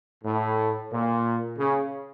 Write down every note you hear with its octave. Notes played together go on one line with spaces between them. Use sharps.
A2
A#2
C#3